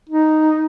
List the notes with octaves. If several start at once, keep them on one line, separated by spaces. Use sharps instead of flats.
D#4